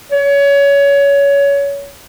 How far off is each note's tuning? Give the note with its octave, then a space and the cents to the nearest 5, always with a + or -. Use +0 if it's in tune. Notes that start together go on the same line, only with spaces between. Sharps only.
C#5 +25